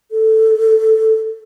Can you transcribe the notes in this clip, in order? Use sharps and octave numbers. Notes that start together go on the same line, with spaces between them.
A4